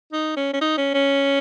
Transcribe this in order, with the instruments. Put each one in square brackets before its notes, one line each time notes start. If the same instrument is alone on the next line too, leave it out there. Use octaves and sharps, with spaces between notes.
[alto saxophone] D#4
C#4
C#4
D#4
C#4
C#4